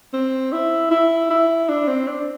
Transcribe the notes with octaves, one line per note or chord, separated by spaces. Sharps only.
C4
E4
E4
E4
D4
C4
D4